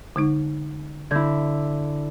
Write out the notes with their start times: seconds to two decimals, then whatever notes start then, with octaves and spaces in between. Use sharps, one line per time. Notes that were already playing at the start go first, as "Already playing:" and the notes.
0.16 D3 G#3 D#4
1.11 D3 E4 G6 G#6